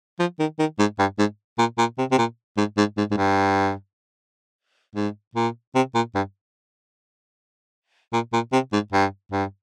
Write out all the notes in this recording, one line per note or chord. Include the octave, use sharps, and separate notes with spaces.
F3
D#3
D#3
G#2
G2
G#2
A#2
A#2
C3
C3
A#2
G#2
G#2
G#2
G#2
G2
G#2
A#2
C3
A#2
G2
A#2
A#2
C3
G#2
G2
G2